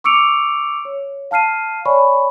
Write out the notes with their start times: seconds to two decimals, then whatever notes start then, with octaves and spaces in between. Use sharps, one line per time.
0.04 C#6 D6 E6 C#7 D7 F7
0.85 C#5
1.31 F5 A5 F6 C7 D#7
1.85 C#5 D5 G#5 B5 C#6